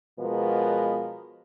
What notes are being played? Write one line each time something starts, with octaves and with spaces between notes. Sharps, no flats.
B2 F3 G#3 B3 A#4